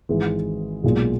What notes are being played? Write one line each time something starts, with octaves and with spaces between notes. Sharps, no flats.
G#1 G#2 E3 G#3
B1 A#2 G#3